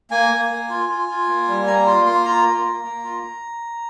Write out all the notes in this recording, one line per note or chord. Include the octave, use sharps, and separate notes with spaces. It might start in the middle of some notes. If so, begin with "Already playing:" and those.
A#3 G#5
A#3
A#3
F4
F4
F4
A#3
G3
A#3 A#5
F4 C6
A#3 C6
F4 A#5
A#3
A#3
A#3
F4